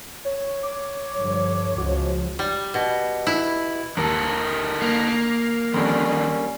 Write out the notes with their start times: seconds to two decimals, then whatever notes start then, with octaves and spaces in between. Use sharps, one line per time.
0.25 C#5
0.63 C#5 D6
1.18 G2 D3 F3
1.78 C#2 F3 F#4
2.39 G3
2.74 B2
3.27 E4
3.97 D#2 D3 A#4 A5
4.82 A#3
5.74 F2 D3 D#3 G3 C#4